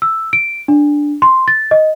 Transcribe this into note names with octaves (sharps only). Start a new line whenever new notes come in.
E6
D7
D4
C6
A6
D#5